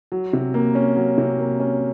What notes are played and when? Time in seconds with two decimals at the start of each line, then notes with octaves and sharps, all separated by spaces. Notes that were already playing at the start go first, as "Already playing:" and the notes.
0.12 F#3
0.33 C3
0.54 A#3
0.75 C#4
0.96 F#3
1.18 C3
1.39 A#3
1.60 C#4